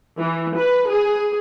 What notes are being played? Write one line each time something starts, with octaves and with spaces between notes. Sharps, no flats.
E3
B4
G#4